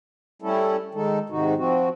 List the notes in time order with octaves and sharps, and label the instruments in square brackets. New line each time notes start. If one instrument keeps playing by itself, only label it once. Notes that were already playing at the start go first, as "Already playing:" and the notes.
[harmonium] G3 A3 C#4 E4 A4
D#3 G#3 D#4 A4
G#2 C3 D#3 D#4 F#4
F3 C4 F#4